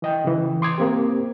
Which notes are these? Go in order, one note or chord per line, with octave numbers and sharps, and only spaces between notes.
E3 D#5 G5
C#3 E3
C6 D6 D#6 G#6
A#3 C4 G4